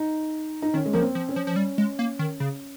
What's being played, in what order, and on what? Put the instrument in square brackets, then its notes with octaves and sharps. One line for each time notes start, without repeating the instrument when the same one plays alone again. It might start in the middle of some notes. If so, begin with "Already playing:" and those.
Already playing: [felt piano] D#4
D#4
[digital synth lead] D#3 [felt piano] C#4
[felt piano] G#3
[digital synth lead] F3 [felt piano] A#3
[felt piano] C4
[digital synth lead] F3
[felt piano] C#4
[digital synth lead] F3
F3
G3
G#3
A#3
D#3
C#3